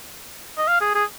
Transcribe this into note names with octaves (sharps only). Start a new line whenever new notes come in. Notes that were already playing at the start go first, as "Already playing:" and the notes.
D#5
F5
G#4
G#4